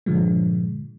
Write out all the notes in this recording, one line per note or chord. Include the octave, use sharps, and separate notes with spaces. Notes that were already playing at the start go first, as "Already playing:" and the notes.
G2 A#2 D3 F3 G#3